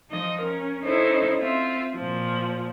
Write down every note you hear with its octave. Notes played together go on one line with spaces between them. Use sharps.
F3 D#4 D#5
C#4 A#4
C#4 D#4 E4 A4 C5 C#5
C4 F4 E5
A#2 F3